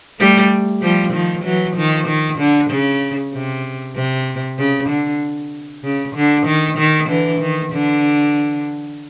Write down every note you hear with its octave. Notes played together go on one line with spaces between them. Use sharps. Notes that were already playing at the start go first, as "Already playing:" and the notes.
G3 A3
F3 G3
D#3 F3
E3 F#3
D#3 F3
D#3
D3
C#3
C3
C3
C#3
D3
C#3
D3
D#3
D#3
D3 E3
D#3
D3